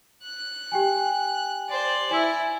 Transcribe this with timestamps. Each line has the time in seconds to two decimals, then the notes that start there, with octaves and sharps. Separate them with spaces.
0.24 F#6
0.72 G4 G5 G#5
1.69 C5 D5
2.11 E4 G#5 E6